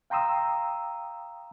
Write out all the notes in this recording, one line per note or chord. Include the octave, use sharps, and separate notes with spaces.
F5 G5 A#5 C6 D#6 E6